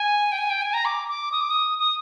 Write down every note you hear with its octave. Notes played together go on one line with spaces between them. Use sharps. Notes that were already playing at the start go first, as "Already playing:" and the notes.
Already playing: G#5
G5
G#5
G5
G#5
A#5
D6
D6
D#6
D6
D#6
D#6